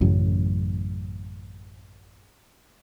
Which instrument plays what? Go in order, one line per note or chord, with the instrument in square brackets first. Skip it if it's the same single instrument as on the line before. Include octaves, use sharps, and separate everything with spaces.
[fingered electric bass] A1 F#2 C#3 F#3